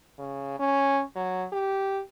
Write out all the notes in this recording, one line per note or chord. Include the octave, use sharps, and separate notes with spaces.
C#3
C#4
F#3
G4